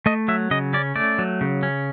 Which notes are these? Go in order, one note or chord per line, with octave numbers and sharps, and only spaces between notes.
A3 D#5
F#3 E5
C#3 D#5
C#4 D5
A3 D5
F#3
C#3
C#4